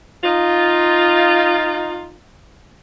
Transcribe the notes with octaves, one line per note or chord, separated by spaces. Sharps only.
D#4 F4